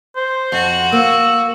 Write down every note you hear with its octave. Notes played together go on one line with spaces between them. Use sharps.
C5
F2 F#4
A#3 E6